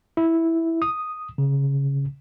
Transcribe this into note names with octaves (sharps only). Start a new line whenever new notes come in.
E4
D#6
C#3